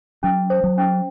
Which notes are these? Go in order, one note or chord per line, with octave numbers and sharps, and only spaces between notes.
F#3 C#4
C5
F#3
C#4